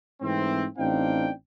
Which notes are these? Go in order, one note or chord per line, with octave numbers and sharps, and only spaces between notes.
G#2 E3 A3 C4
A1 C4 D4 D#4 F5 G5